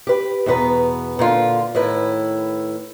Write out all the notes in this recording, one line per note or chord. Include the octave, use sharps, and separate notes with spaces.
G4 B4
E2 B2 B3 B4 A#5
A#2 D3 F4
A2 D#3 E4 B4